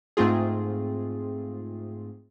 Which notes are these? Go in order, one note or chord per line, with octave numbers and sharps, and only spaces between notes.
G#2 A3 C4 F4 G#4